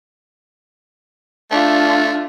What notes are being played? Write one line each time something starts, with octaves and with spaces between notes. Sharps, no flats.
A3 D4 F4